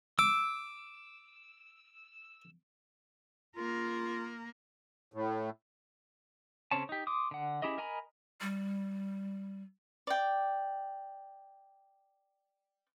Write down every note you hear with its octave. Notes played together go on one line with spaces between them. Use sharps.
D6 E6
A#3 F4 A#4
A2
C#3 C4 C#4 C#5 A5
D#4 G4
C6 D6 D#6
D3 F#5
C#4 E4 G4 G#4 D#5
A#4 D#5 G#5 A#5 B5
G3
D5 G5